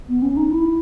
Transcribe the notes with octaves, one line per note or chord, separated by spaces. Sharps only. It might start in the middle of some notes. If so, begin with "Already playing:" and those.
B3
C#4
D#4
E4